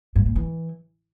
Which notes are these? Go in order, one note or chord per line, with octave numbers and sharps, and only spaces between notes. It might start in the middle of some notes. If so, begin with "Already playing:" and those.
G2
A#2
E3